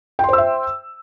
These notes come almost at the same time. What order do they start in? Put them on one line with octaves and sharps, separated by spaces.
G5 C6 C5 E6 E5